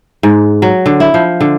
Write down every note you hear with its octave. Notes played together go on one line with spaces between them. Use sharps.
G#2
F#3
D3
E4
F3
D3